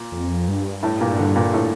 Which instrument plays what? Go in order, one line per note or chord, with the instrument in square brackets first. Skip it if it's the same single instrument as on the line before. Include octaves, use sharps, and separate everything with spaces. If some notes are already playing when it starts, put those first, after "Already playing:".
Already playing: [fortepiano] A#2
[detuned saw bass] F2
G2
[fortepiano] A2
A#2
D3
A#2
A2